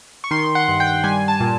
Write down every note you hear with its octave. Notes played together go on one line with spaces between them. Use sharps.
C#6
D#3 C6
F#5
G2
G5
G3 G#5
A5
A#2